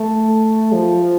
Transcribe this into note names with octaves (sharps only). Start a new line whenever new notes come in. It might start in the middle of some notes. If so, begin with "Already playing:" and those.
Already playing: A3
F3